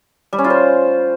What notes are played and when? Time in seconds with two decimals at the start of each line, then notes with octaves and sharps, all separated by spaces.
0.33 G3
0.38 C#4
0.44 F4
0.50 C5